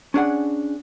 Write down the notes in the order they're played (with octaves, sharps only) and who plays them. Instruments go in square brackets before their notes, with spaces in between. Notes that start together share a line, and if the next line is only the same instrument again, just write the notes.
[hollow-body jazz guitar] C#4 D4 G#4 F#5